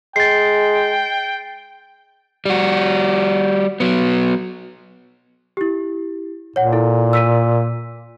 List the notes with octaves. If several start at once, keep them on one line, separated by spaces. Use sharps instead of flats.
G#3 G5 A6 C7
G3 F#4
F#3 B3
E4 G4
A#2 C#5 F#5
E4 A4
E6 B6 D#7